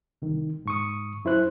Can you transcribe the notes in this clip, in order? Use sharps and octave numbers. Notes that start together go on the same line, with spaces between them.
C2 D#3
G#2 C#6 D#6
F#2 E4 C5 F#6